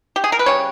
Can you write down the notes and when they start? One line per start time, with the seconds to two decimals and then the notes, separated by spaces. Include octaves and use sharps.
0.16 G4
0.24 G#4
0.32 A#4
0.39 B4
0.46 C#3 G3 C#5